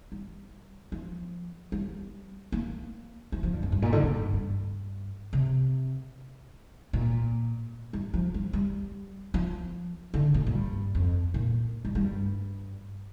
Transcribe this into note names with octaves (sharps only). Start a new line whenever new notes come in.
G3
F3
G3
A#3
F3
F3
G2
F2
G2
A#2
D3
A#2
G2
G2
C3
A#2
G3
F3
G3
G3
F3
D3
A#2
A#2
G2
F2
A#2
G3
G3
G2